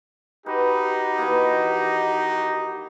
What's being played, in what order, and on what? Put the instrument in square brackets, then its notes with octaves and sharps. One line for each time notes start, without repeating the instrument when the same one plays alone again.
[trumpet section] D#4 F#4 G4 [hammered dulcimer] B4
[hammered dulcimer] D#3 E3 A#3